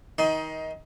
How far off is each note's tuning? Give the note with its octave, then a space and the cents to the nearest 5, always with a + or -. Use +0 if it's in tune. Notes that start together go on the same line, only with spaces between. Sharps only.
D#3 +25 D#4 +20 C6 +0